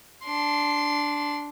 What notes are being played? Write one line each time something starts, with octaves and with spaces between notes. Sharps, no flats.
D4 C6